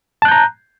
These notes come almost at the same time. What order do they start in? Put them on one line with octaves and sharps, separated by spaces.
A5 F#6 G6 A#5